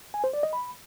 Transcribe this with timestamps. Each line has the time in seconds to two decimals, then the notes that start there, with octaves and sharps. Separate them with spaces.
0.14 G#5
0.24 C5
0.33 D5
0.43 D#5
0.53 B5